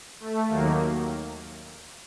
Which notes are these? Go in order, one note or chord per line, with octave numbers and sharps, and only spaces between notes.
A3
D#2 D#3 F#3 A#3